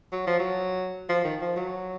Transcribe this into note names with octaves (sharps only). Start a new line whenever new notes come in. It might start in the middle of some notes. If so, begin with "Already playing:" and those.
F#3
F3
F#3
F3
D#3
F3
F#3